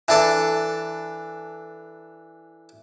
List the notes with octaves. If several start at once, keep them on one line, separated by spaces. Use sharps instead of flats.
E3 D4 A4